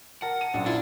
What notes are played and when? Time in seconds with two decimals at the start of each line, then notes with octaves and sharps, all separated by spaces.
0.22 A#4 F#5 A5
0.41 D#7
0.54 A#1 F#2 D4
0.66 D4 E4 F4